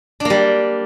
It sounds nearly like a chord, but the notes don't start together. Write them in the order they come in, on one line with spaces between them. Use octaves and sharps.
D4 A#3 G3